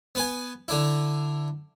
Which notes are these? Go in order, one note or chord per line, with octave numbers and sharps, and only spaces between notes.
B3 B4 G#5
D3 D4 E4